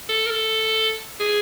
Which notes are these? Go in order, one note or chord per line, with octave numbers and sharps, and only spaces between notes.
A4
A#4
A4
G#4